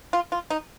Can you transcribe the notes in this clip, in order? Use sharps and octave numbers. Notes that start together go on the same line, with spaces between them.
F4
F4
D#4